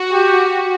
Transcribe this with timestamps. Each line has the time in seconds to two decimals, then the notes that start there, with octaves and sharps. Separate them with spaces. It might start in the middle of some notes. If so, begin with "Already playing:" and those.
Already playing: F#4
0.12 G4